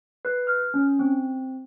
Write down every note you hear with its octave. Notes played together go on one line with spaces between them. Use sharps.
B4
F6
C#4
C4